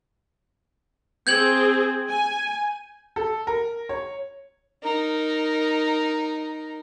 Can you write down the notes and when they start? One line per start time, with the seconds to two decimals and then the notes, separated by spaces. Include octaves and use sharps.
1.27 C4 G#4 G6 G#6 F#7
2.10 G#5
3.16 A4
3.47 A#4
3.89 C#5
4.83 D#4 A#4